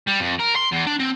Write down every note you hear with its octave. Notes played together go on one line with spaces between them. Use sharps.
G3
F2
A#4
C6
E2
D4
C4